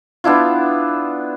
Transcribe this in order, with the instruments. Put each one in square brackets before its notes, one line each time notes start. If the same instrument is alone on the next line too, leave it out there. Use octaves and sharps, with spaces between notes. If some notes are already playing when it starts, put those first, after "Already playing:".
[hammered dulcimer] B3 D4 E4 F4